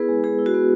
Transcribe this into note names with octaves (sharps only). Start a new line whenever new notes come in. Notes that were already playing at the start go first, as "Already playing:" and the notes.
Already playing: B3 E4 G#4 B4
G#3
G#3 G#4
E4
F#4
B3